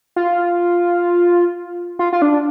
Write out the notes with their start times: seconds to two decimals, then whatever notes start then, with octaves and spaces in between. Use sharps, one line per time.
0.16 F4
1.99 F4
2.13 F4
2.22 D4